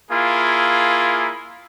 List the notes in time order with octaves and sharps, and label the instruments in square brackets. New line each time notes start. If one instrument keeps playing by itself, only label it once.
[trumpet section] A#3 E4 F4 G#4